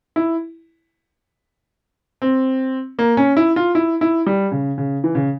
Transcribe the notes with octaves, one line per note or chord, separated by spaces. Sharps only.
E4
C4
A#3
C#4
E4
F4
E4
E4
G3
C#3
C#3
E3
C#3